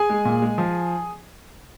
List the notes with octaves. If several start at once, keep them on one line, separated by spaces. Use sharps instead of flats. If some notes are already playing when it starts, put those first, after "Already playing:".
Already playing: G#4 G#5
G#3
A#2
G#3
F3